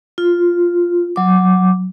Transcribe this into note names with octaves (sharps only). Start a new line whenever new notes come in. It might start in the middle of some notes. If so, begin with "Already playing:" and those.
F4
F#3 D6